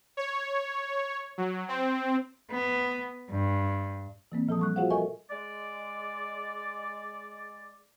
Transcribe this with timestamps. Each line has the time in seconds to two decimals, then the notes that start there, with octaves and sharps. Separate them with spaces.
0.17 C#5
1.38 F#3
1.68 C4
2.50 B3
3.31 G2
4.32 E3 A#3 C4
4.48 A#2 F3 A4 A5 D#6
4.59 G3 C#6 F#6
4.76 F4 F#4 G#4 C5 F5 F#5
4.90 A4 A#4 D#5 E5 G#5 C#6
5.31 G#3 D5